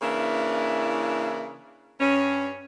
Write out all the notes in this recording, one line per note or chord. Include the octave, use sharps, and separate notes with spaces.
C#3 E3 A#3 D4 E4
G2 C#4